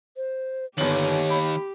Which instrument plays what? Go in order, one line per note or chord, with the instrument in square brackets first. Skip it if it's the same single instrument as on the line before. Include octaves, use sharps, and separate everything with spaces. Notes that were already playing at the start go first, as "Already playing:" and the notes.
[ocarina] C5
[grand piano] G1 F#7 [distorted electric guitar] D#2 [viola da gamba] G4 [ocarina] C#5
[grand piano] B5